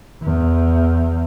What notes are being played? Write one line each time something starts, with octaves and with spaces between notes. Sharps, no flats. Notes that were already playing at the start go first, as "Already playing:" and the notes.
E2